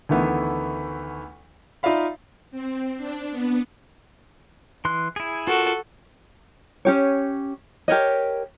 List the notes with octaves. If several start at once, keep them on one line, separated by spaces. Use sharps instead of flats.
D2 D#3 E3 A3 B3
D#4 F4 D5 E5 F5 B5
C4
D4
B3
E3 C6 F#6
E4 G#4
F4 F#4 A4 A#4
C#4 G4 C#5
G4 A#4 C#5 D#5